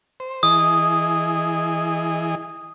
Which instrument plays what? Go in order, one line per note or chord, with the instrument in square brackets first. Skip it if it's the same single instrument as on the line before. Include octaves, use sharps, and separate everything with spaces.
[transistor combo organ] C5
[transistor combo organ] E3 G#4 D#5 [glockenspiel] D#6